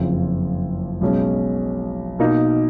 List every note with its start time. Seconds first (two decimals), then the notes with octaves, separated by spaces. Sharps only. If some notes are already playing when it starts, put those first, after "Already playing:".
Already playing: F#1 F2 C#3 F3
1.01 B1 B2 G#3 C#4
2.19 B2 A#3 D#4